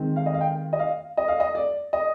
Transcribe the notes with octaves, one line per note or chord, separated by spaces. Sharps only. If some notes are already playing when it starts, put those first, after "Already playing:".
Already playing: D#3 G#3 C4
F5
D#5
F5
G5
D#5
F5
D#5
F5
D#5
D5
D#5